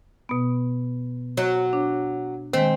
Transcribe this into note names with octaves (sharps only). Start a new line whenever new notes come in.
B2 B3
F#3
D4
D#3 G#3 C4